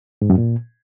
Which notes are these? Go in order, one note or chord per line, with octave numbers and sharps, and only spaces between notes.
G#2
F#2
A#2